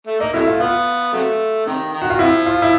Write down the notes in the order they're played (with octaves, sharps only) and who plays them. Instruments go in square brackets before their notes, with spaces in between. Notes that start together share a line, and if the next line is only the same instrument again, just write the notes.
[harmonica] A3
[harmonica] A#3 [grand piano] D#4
[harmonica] C3 F#3 A3 [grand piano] E4
[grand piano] F4
[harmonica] B3 [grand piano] F4
[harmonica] C3 F#3 A3
C3 D#3
D#3
[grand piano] F#4
F4
[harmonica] C3 F3 [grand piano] E4
[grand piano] F4
E4